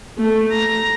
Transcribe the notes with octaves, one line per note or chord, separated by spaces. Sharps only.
A3
A#5